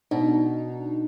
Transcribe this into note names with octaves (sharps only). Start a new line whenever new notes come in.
B2 D4 D#4